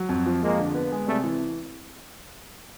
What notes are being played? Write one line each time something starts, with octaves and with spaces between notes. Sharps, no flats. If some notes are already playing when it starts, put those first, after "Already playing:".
Already playing: F#3
F2
F3
F2 G#3 A#3
D3
B3
G#3
C3 G3 A3
E3